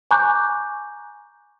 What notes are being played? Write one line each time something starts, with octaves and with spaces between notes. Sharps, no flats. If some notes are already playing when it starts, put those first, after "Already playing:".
G#5 A#5 C#6 D6 F#6 G6